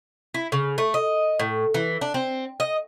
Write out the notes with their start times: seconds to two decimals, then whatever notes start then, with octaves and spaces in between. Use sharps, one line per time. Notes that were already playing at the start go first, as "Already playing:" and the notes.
0.34 E4
0.52 C#3
0.78 A3
0.94 D#5
1.39 A2
1.74 E3
2.01 D4
2.14 C4
2.60 D#5